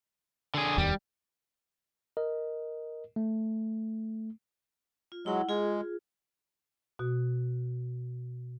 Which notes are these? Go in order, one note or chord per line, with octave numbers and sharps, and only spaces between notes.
D3 G#4
D1 E2 D#3 G3
A#4 D#5
A3
F4
F#3 G#3 E4 F#5
G#3 F4 G#4
B2 F#4